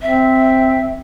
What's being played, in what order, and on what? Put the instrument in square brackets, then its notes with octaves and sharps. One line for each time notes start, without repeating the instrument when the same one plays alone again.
[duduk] C4 [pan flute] E5